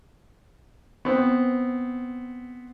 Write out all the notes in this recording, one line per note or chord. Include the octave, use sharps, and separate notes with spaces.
B3 C4